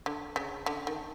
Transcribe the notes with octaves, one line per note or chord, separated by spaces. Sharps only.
D3
C#3
D3
D#3